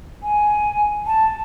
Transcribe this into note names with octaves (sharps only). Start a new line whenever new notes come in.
G#5
A5